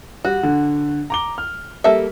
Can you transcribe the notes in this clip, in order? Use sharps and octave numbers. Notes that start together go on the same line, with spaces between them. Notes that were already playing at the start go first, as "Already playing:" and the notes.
G3 F#4
D3
A#5 D6 G7
F6
G3 A#3 A4 E5